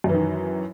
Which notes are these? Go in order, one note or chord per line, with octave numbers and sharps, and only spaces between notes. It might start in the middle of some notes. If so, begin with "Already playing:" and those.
F#2 D#3 E3